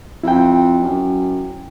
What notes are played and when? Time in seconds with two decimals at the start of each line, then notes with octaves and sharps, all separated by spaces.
0.23 F2 E4 G5
0.82 F#2